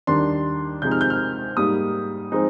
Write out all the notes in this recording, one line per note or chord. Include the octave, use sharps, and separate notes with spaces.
D#2 D#3 G3 D4 C6
C3 F3 G#3 D#4 G6
F6
G6
F6
G#2 G3 A#3 D#6
F3 G#3 C4 D#4